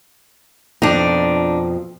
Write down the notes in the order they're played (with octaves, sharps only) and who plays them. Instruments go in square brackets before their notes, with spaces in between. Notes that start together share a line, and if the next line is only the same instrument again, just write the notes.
[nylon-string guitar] F2 B2 F3 [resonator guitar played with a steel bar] D4 D#4